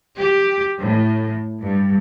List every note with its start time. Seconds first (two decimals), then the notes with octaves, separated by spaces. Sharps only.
0.18 G4
0.82 A2
1.60 G2